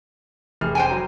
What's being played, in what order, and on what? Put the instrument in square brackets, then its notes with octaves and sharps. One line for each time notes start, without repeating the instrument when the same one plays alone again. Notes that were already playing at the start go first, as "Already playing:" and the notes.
[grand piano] F1 G#4 F6
[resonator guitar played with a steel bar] C5 G5 G#5
[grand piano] F#3 A#5